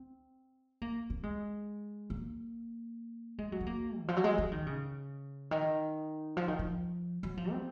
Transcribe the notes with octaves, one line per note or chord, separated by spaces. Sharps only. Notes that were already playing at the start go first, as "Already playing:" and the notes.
Already playing: C4
A#3
C4
G#3
A#3
G#3
F#3
C4
A#3
D#3
F3
F#3
G#3
F3
D#3
C#3
D#3
F3
D#3
F3
F#3
F3
C4